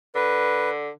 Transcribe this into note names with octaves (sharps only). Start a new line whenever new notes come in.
D3 B4